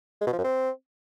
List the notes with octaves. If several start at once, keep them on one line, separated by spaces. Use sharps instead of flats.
G#3
B2
F3
F#2
C4